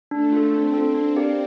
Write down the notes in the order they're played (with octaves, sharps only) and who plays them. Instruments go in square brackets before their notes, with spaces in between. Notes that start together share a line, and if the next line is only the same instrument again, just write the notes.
[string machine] A3 [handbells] D4
[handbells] F4 A4
[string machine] C4 [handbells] D4
[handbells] F4 A4
D4
G4 A#4 D5 F5